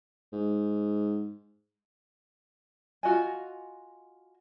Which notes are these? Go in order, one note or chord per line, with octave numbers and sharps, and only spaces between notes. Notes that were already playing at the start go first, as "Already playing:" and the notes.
G#2
F4 F#4 D#5 G#5